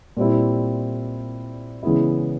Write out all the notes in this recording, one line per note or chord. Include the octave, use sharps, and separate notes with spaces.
A#2 G3 C4 E4
C#3 E3 G#3 B3 E4